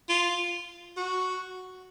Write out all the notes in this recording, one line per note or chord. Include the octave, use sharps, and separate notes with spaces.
F4
F#4